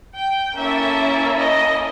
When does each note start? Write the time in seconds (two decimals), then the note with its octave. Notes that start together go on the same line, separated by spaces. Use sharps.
0.16 G5
0.57 A#3 C#4 E4 A4 E5
1.38 D#5